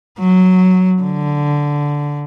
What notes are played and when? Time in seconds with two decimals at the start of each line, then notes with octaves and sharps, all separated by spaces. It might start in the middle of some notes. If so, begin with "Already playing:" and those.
0.19 F#3
1.02 D3